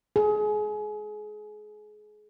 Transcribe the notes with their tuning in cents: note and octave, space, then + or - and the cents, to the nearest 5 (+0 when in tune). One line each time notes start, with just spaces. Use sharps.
G#4 +30